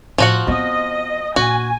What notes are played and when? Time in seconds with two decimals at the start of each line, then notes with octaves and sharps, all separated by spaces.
0.18 A2 F3 F#4 F#5
0.47 B3 C4 D#5
1.36 A#1 F#4 G#5